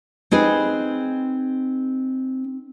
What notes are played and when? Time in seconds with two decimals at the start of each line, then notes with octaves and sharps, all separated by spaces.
0.31 C4 D#4 G#4 B4